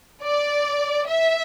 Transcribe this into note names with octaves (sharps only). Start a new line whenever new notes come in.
D5
E5